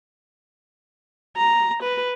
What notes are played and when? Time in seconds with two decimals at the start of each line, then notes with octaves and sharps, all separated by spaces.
1.37 A#5
1.83 B4